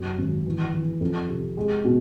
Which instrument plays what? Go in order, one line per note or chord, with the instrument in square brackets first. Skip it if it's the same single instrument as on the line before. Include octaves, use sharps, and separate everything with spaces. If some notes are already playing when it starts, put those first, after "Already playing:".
Already playing: [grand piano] F#2 C3
G#1
E3
E3
F2
C3
G#3
B2